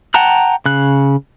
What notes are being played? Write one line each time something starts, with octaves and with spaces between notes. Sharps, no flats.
F#5 G5 A5 A#5 F#6
C#3 F#6